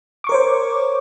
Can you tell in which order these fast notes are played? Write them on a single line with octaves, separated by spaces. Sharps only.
D6 C#6 A#4 C#5 C5